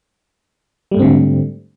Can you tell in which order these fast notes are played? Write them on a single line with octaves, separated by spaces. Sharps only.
G3 A3 G#2 C4 D3